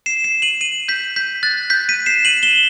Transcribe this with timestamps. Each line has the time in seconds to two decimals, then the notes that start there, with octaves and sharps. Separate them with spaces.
0.06 C7 E7
0.24 C7 E7
0.42 D#7 F#7
0.61 D#7 F#7
0.88 G6 B6
1.16 G6 B6
1.43 F#6 A6
1.70 G6 B6
1.89 B6 D#7
2.06 C7 E7
2.25 D#7 F#7
2.43 E7 G7